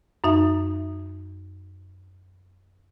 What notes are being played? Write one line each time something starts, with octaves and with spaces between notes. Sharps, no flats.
F#2 D#4 E5